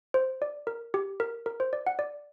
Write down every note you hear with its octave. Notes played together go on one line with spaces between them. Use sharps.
C5
D5
A#4
G4
A#4
A#4
C5
D5
F#5
D5